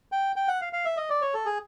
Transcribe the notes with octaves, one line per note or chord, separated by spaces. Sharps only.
G5
G5
F#5
F5
F5
E5
D#5
D5
C#5
A4
G#4